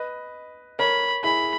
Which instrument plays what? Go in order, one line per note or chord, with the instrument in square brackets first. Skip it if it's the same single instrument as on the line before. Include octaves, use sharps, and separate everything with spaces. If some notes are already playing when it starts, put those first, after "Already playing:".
Already playing: [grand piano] B4 D#5
[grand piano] A#4 C#5 [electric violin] B5
[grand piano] E4 G#4 [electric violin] B5